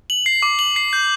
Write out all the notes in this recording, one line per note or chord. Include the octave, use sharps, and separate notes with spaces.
F#7
C7
D6
F#7
C7
G6